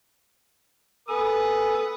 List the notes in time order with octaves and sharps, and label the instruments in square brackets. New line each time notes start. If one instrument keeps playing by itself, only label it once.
[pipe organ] A4 G#5 [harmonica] B4 D#6